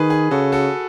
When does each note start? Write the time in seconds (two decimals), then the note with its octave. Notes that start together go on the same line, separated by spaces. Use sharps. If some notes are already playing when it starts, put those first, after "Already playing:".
Already playing: D#3 G#4 B4
0.10 G#4
0.31 C#3 F#4 A4
0.52 F#4 A4